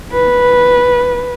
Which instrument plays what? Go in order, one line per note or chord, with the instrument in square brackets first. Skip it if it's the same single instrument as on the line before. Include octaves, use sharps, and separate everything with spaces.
[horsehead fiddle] B4